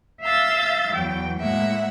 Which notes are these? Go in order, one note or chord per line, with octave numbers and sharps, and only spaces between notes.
E5 F5 E6 G6 A6
E2 F#3 G5
A2 G#3 A#3 E5 F#5